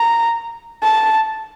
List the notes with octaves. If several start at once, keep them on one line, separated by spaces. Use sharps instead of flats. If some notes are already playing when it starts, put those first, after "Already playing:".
Already playing: A#5
A5